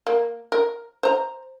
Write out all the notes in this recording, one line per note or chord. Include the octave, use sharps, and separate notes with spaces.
A#3
A#4
C5 A#5